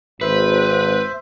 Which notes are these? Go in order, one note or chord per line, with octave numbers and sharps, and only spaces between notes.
G#1 B4 C5 E5